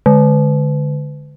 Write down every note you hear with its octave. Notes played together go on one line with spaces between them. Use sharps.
D3